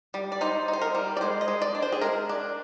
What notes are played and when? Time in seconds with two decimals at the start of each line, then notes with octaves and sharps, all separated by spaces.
0.14 G3
0.32 D5
0.41 D#4 C5
0.68 D#4
0.73 C5
0.81 A#4
0.95 G3
1.17 D5
1.21 G#3 C5
1.41 D#5
1.48 G#3
1.62 D5
1.75 D4
1.82 C5
1.92 G#4
2.01 G#3 A#4
2.29 D4